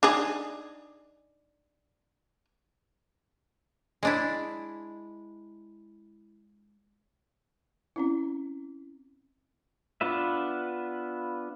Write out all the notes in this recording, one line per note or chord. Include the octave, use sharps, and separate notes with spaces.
D4 D#4 G#4
G#3 D4 E4
C4 C#4 E4
B3 D4 F4 B4 E5